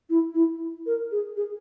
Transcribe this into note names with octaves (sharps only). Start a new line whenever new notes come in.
E4
E4
A#4
G#4
G#4